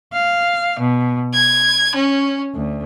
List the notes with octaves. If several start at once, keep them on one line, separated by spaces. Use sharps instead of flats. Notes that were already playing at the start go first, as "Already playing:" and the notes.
F5
B2
G#6
C#4
D2